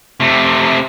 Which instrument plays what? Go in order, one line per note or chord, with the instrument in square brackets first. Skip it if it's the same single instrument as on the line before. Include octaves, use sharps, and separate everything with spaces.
[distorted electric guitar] C3 A3